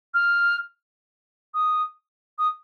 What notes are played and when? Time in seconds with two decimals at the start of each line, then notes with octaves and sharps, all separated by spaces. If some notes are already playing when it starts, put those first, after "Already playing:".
0.14 F6
1.54 D#6
2.39 D#6